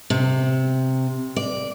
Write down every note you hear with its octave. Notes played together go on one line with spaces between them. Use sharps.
C3
D5